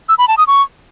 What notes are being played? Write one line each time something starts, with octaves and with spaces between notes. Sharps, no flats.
E6
B5
A5
D#6
C#6